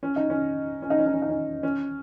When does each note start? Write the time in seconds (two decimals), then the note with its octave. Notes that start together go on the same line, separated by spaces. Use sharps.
0.03 C#4
0.16 D#4
0.30 C#4
0.82 C#4
0.90 D#4
0.99 C#4
1.06 D#4
1.14 C#4
1.22 D#4
1.29 C#4
1.63 C#4